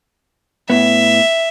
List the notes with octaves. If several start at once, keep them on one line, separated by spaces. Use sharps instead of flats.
A2 B3 E5